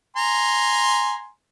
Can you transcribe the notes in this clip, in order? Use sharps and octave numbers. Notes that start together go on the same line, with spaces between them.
G#5 A#5 C6